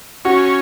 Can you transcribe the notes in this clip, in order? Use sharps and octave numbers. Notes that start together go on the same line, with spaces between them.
C#4 F#4